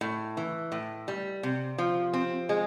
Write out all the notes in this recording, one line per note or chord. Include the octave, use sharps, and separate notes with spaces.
A2
E3
A2
G3
C3
F3
C4
G#3